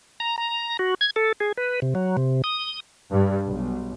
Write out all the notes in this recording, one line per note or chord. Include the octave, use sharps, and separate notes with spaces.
A#5
A#5
F#4
G#6
A4
G#4
B4
C3
F#3
C3
D#6
G2
B1